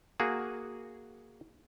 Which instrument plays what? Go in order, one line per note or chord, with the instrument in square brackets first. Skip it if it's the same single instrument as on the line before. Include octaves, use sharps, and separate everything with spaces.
[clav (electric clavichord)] A#3 F#4 G#4